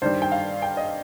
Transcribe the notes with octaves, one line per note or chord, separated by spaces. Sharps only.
G2 D#3 G3 C5
G5
F5
G5
D#5